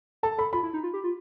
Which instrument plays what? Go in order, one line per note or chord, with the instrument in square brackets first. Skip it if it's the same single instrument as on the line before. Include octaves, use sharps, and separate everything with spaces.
[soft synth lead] A4 [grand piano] A5
[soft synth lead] A4 [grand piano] B5
[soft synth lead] F4 [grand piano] B5
[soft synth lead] E4
D#4
F4
G4
F4